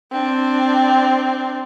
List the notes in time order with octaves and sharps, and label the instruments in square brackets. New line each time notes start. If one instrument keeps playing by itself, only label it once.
[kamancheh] C4 D4